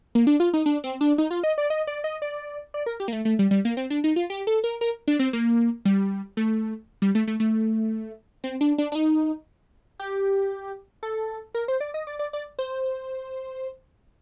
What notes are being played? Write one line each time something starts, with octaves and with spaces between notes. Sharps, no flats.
A#3
D4
F4
D#4
D4
C4
D4
D#4
F4
D#5
D5
D#5
D5
D#5
D5
D5
A#4
G4
A#3
A3
A3
G3
G3
A#3
C4
D4
D#4
F4
G4
A4
A#4
A#4
D4
C4
A#3
G3
A3
G3
A3
A3
A3
C4
D4
D4
D4
D#4
G4
A4
A#4
C5
D5
D#5
D5
D5
D5
C5